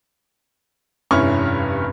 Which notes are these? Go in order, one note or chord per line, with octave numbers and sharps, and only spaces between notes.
F1 G2 C#4 E4 C#6 F6